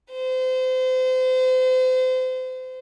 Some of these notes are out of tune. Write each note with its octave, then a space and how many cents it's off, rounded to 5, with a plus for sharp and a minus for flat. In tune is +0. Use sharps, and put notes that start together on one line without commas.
C5 -30